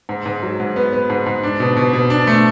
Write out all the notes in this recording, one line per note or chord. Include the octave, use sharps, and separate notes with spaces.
G#2
G#2
F#3
G#2
B3
B3
G#2
G#2
D4
B2
B2
B2
D4
A3